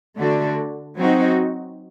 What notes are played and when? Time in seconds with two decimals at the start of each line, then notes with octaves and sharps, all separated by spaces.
0.17 D3 A3 D4 F#4
0.97 F#3 C4 D#4 F#4